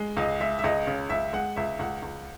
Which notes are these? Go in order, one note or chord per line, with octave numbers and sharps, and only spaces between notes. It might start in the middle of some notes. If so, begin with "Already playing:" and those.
Already playing: G#3
C#2 D#5
G#3 E5
E5
C#2 D#5
C#3
C#2 E5
G#3 F#5
C#2 E5
C#2 F#5
C#2